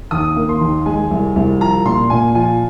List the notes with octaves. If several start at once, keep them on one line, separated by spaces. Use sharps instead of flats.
D#2 D#6
A#3
C6
D#2
G#3 G#5
C2
C2
F3 A#5
A#2 C6
A#2 G#5
F3 G#5